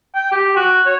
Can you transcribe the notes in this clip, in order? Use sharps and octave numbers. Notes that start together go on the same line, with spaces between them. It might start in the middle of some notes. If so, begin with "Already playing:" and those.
G5
G4
F#4
C#5